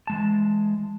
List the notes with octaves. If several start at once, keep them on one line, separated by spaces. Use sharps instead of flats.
E3 G#3 A5